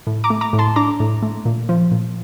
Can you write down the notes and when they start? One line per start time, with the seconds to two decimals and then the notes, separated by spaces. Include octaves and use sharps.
0.07 A2
0.24 A#5 D6
0.30 A3
0.41 A#5 D6
0.53 A2
0.59 A5 C6
0.76 D4 A#5 D6
1.00 A2
1.22 A3
1.45 A#2
1.69 F3
1.92 A#2